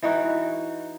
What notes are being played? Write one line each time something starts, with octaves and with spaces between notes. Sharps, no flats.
E3 D#4 F#4